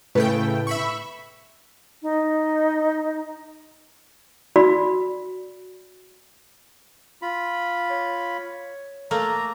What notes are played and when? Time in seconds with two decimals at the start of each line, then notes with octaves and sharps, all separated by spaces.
0.15 A2 C#3 A3 B4 G5
0.67 E5 B5 C#6
2.02 D#4
4.56 F#4 D5 B5
7.22 F4 B5
7.90 C#5
9.11 A3 A#3 A#5